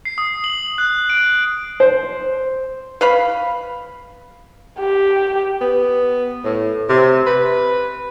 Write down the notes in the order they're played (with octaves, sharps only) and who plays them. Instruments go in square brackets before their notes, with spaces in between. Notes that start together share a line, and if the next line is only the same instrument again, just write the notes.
[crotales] C7
D#6
F#7
F#6
D7
[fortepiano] C5
[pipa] B4 F5 B5
[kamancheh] G4
[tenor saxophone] B3
A2
C3
B4